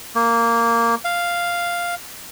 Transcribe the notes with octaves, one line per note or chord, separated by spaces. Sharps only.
A#3
F5